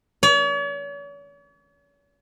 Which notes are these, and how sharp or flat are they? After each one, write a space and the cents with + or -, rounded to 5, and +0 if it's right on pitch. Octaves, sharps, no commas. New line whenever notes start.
C#5 +45